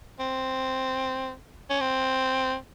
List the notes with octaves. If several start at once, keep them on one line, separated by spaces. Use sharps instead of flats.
C4
C#4
C4